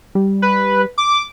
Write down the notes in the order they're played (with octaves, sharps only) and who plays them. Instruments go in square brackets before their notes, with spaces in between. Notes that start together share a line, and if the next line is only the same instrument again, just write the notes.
[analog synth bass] G3
[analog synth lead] B4
D6